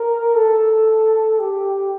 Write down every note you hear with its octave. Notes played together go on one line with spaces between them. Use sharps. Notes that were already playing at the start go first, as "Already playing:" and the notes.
Already playing: A#4
A4
G4